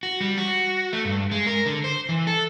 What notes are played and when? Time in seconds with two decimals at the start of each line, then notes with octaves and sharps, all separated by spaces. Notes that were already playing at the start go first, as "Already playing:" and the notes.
0.03 F#4
0.21 G3
0.37 F#4
0.93 A3
1.05 G2
1.31 G#3
1.47 A#4
1.66 D3
1.84 C5
2.09 E3
2.27 A4